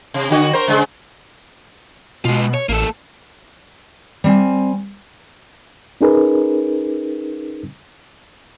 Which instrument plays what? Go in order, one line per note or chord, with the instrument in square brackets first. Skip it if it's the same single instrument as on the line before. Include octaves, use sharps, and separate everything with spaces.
[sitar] C3
D3 F#4
A#4 C5
C#3 G#3
[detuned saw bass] B2 [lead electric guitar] G#3 F4
[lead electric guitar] C#5
[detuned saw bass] A1 [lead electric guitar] A#3 A4
[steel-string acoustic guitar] G3 C4 G#5
[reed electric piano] C#4 D#4 G#4 A#4 B4